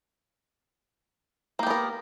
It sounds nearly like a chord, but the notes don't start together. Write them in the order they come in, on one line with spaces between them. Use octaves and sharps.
A#3 G4 B3 A#4